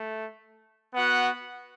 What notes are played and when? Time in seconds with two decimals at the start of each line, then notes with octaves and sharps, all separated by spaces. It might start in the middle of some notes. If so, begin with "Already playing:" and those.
Already playing: A3
0.93 B3 F#4 F#5